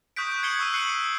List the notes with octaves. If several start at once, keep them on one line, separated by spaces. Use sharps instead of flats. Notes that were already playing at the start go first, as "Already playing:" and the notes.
C#6 D#6 F#6 G6 B6 D7
F#6
G#6 C7 C#7 F#7 G7
C#6 E6 D#7
F#6 C7 C#7 D#7 F#7